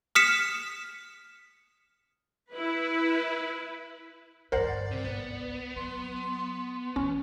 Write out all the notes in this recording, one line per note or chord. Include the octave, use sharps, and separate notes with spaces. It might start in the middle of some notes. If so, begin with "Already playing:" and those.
D#6 F6 B6 C#7 E7
E4 B4
D2 G2 A#4 C5 D5 F#5
C3
G#1 C#2 B3
F#3 C6
C#3 E3 C#4